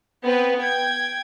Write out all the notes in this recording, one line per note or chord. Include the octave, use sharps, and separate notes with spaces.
B3 C4 B4
G5 G#6